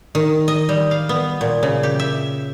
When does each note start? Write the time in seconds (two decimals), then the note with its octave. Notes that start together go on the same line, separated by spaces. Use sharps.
0.15 D#3
0.48 D#5
0.69 G3
0.91 F5
1.09 B3
1.41 A#2
1.63 C#3
1.83 G4
2.00 E5